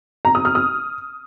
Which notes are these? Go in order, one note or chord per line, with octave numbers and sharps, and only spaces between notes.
A#5
D#6
F6
D#6